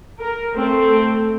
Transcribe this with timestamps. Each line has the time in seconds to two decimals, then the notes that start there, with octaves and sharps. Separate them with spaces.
0.20 A#4
0.55 A3 C4